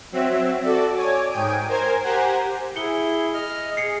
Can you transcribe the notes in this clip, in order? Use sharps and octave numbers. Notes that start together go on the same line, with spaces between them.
F#3 C4 E5
F#4 A4 D5
C#5 G#5 D6
G#2 G5 G#5 D#6 D7
A#4 C5 G#5 G#6
G4 C5 F#5 G#5 A#5
E4 G#4 C#7 G7
D#5 F6
G#4 C7 C#7